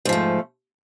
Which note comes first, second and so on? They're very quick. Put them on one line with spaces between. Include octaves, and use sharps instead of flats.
G#2 F3 A3